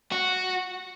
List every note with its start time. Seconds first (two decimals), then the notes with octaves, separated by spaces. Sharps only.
0.12 F#4